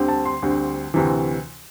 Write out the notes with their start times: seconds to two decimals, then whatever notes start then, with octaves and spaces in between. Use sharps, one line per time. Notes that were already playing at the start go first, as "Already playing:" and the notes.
Already playing: D2 D3 G3 C4
0.08 A5
0.25 C6
0.42 D2 D3 G3 C4
0.94 D2 C3 E3